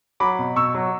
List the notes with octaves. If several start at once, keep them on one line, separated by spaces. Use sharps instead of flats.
F#3 B5 D6
B2
B2 C#6 E6
F#3